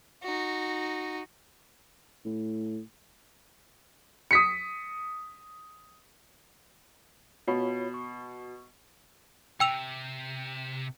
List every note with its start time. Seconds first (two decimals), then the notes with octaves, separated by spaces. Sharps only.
0.23 D#4 F#4
2.25 A2
4.31 D#6 B6 C#7
7.48 B2 F4 C#5 B5
7.94 C#6
9.60 C3 G5 E6 F7